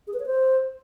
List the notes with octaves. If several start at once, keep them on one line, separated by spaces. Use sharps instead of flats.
G#4
B4
C#5
C5